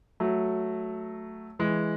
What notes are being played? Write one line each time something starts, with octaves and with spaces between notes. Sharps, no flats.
F#3 A3
E3 G#3